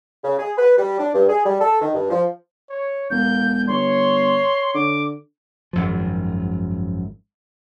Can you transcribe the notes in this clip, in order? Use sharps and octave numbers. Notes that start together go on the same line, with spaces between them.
C#3
G#4
B4
G3
D4
G2
G#4
G3
A4
D#3
G2
F3
C#5
E1 A#3 G6
G1 C#5 C6
D3 D6
G#1 F#2 F3